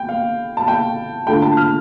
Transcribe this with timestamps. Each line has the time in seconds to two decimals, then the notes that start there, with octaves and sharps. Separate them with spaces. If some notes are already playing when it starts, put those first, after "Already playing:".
Already playing: G5
0.09 F5
0.57 A5
0.68 G5
1.27 D3 A3 F4 G5
1.42 A5
1.57 F6